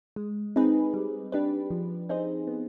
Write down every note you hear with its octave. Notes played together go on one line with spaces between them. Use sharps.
G#3
C4 D#4 G#4 B4
G3
D4 G4 B4
F3
C4 D#4 G#4 C5
B3